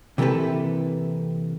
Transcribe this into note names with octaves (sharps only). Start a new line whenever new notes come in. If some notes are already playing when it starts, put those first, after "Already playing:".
C3 E3 A#3 G4 A4 B4